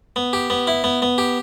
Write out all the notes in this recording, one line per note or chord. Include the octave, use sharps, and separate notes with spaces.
B3
G4
B3
E4
B3
B3
G4